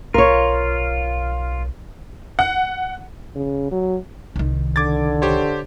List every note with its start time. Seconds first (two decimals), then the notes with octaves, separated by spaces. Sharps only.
0.14 B1 F4 A#4 C#5
2.39 F#5
3.35 C#3
3.72 F#3
4.36 C2 D#3
4.76 D3 D6 G#6 A6
5.22 G4 C5 C#5